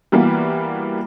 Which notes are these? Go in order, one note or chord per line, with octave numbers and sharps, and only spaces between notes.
E3 G3 A#3 B3 F#4